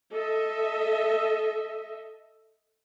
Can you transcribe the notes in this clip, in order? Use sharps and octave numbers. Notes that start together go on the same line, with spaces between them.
A4 D#5 E5